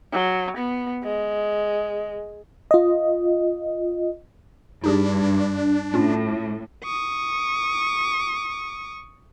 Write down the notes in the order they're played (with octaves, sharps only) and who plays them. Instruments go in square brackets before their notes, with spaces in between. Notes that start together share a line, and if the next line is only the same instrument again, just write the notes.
[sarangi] F#3
B3
G#3
[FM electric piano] F4 D#5
[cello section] G2 [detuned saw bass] D4 [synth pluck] D#4 G4 G#4
[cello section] A2 [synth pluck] C#4 F4
[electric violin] C#6 D#6